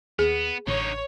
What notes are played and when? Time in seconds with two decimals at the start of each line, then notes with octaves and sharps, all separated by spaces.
0.19 D#2 B3 G#4
0.67 A1 D3 D#4 C#5